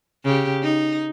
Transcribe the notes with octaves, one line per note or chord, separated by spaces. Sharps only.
C#3 G4
D#4